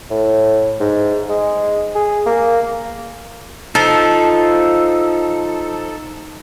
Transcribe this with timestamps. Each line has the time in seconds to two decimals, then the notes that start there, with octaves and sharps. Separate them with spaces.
0.10 A2
0.80 G#2
1.29 G#3
1.95 G#4
2.26 A#3
3.75 F3 D#4 A4